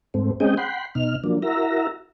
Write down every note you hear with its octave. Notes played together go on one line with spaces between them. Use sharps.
G#2 A3 C4
G#3 C4 C#4 G#4 D#5 G5
F#5 G5 B5 C6
B2 D#4 F6
F3 F#3 A#3 D4
E4 F#4 A#4 E5 A#5